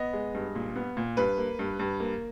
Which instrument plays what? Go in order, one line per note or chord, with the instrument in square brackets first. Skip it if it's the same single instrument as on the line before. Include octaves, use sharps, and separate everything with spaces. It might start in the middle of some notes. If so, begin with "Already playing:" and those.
Already playing: [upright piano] B3 D#5
G#3
G2
A#2
B3
A#2
G2 B4
A#3
G2
G2
A#3